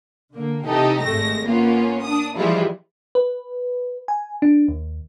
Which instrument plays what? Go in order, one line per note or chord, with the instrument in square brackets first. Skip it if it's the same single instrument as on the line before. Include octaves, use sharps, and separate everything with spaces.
[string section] D3 A#3
C3 E3 D#4 G4 A4
G#1 G#3 A3 A#6
A#3 B3 C#4 F4
D4 D#6
E3 F3 G3 G#3 E4 F4
[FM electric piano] B4
G#5
D4
D#2